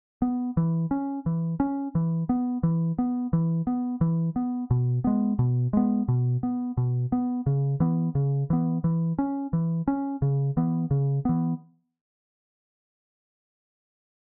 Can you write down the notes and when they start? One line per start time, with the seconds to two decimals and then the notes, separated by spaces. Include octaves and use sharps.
0.22 B3
0.57 E3
0.91 C#4
1.26 E3
1.60 C#4
1.95 E3
2.29 B3
2.63 E3
2.99 B3
3.33 E3
3.67 B3
4.01 E3
4.36 B3
4.71 B2
5.04 G#3 B3
5.39 B2
5.73 G#3 B3
6.08 B2
6.43 B3
6.77 B2
7.12 B3
7.46 C#3
7.80 E3 B3
8.15 C#3
8.50 E3 B3
8.84 E3
9.19 C#4
9.53 E3
9.88 C#4
10.22 C#3
10.57 E3 B3
10.91 C#3
11.25 E3 B3